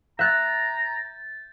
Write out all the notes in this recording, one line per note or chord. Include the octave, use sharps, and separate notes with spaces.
E5 A#5 F#6 G6 A6